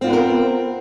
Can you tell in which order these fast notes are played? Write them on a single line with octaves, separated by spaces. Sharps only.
C4 F4 B3 B4 A#4